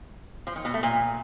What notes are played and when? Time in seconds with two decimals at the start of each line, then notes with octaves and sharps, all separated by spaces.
0.47 F3
0.56 D#3
0.65 B2
0.74 A3
0.83 A#2